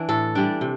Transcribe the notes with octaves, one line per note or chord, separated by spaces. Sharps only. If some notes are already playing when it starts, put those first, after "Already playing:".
Already playing: E3 D4
A2 A4
E3 G3 D4
C3